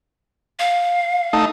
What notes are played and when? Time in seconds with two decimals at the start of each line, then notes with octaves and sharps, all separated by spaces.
0.59 F5
1.33 A3 D#4